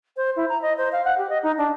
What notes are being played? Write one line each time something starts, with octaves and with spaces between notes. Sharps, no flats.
C5
E4
A#5
D#5
C5
F5
F#5
G4
D#5
D#4
D4